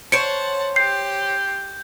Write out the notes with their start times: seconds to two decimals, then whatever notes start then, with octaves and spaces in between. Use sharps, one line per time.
0.12 C5 C#5 F#5 A5 C#7 D7
0.76 G4 C6 G6 C7